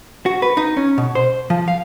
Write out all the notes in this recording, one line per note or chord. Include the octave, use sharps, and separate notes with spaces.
F#4
B4
D#4
C#4
B2
C5
F3
F5